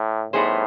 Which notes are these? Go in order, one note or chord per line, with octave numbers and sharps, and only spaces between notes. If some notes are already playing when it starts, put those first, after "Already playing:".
Already playing: A2
A2 G3 B3 D#4 G#4 C5